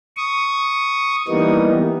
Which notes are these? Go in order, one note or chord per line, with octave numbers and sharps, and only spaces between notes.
C#6 D#6
E3 G3 A#3 B3 D#4